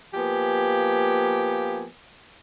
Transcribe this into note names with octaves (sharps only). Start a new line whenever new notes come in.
F3 A#3 B3 G4 G#5